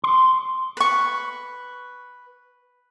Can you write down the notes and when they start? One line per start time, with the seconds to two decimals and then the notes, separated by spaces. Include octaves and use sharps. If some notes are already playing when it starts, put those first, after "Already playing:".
0.04 C6
0.77 B4 C#6